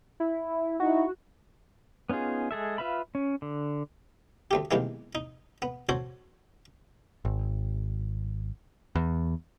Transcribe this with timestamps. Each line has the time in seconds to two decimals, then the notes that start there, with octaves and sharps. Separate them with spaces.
0.20 E4
0.80 D#4 E4 F#4
2.10 B3 C#4 D#4 F4 G#4
2.51 G#3 G#4 A4 E5
2.78 F4 B4 E5 F5 B5
3.15 C#4
3.42 D3
4.51 D2 A3 G4
4.71 B1 E2 C3 D#3 G#3 A#3
5.15 D#4
5.62 B3
5.89 F#4 A4 C5 C#5
7.25 G#1
8.96 E2